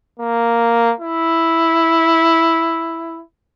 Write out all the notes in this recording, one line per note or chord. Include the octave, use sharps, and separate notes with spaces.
A#3
E4